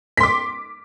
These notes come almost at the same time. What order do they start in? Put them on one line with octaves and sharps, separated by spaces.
B6 C6 D6